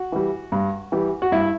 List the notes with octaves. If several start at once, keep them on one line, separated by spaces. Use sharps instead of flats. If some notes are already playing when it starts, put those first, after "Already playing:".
Already playing: F#4
E3 G3
G2
E3 G3
F#4
G2 E4